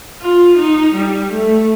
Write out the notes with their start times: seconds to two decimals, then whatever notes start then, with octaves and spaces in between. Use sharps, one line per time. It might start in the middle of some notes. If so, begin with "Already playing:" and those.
0.22 F4
0.58 D#4
0.95 G3
1.31 A3